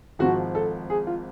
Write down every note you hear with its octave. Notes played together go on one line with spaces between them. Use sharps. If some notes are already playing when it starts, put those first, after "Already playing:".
G#1 G#2 F3 F#4
A4
G#4
F4